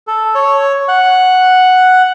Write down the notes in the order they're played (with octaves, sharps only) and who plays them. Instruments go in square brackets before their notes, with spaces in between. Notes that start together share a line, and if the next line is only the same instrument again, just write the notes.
[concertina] A4
C#5
F#5